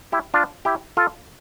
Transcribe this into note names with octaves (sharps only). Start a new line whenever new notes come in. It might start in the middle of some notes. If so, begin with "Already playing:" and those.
E4 G4
D4 F4
E4 G4
F4 A4